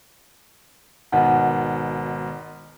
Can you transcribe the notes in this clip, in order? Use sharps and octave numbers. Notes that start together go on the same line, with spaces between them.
G#1 B2 D#3 F#5